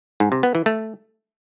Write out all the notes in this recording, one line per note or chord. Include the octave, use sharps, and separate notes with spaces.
G#2
C3
B3
E3
A3